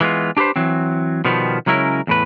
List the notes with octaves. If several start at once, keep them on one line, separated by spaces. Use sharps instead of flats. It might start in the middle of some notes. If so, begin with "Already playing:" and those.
E3 G#3 B3 F4
D4 G4 G#4 B4 C5
E3 F#3 C4
B2 D#3 F3 G3 B3
C#3 F#3 G#3 C#4 E4 A#4
E2 A2 B4